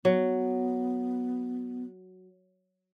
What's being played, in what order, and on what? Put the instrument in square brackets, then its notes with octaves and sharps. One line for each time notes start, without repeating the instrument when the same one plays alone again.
[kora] F#3 [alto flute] B3